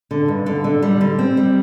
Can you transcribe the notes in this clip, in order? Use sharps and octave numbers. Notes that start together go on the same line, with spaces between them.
D3
G2
D3
D3
G3
D3
C4
G3